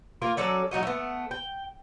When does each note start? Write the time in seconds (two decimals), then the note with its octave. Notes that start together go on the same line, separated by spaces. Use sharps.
0.22 A#3 F4 A#4
0.37 F#3 C#4 A4 D5
0.71 F#3 D#4 F#4 D#5
0.83 A3 B3
1.31 G5